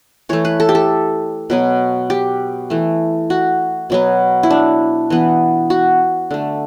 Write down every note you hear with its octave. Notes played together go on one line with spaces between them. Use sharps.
E3 A3 C#5
B4
A4
G4
A4
B2 F#3 B3
G4
E3 A3
F#4
B2 F#3 B3
E4
D4
E3 B3
F#4
D3 A3